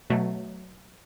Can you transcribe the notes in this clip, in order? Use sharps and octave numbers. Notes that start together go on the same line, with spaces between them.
B2 F#3 A3